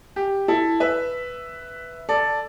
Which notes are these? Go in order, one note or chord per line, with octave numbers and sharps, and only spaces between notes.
G4
E4 A4
B4 E5
A4 D5